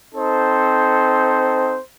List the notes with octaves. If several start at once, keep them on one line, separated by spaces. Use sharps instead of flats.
C4 D#4 A4 C5